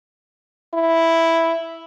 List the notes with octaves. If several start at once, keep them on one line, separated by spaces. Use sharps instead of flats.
E4